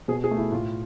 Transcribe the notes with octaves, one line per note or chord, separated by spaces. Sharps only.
B2 G#4
G#4
A3
E4
A2 F4